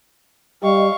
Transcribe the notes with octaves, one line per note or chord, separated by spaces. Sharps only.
G3 G4 D#5 F5 C#6